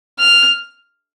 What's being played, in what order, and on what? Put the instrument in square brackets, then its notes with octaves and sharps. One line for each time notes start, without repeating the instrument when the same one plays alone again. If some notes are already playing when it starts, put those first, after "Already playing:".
[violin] F6